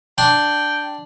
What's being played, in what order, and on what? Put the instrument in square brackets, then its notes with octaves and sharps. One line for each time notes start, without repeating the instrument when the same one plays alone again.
[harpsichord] D4 C6 [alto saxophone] G5